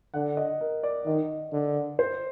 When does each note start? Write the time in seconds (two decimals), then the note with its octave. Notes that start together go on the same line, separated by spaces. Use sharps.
0.14 D3 F#5
0.37 D#5
0.61 A#4
0.83 D5
1.06 D#3 D#5
1.52 D3
1.99 C5